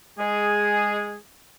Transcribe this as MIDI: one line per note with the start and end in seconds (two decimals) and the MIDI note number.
0.19 1.16 56
0.19 1.16 68